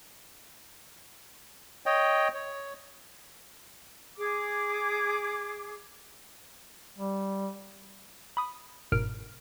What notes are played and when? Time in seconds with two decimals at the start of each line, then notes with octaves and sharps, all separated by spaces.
1.86 C#5 D#5 G5
2.34 C#5
4.17 G#4 D6
6.98 G3
8.37 B5 D#6
8.92 G1 G#2 B2 A#4 F6 D7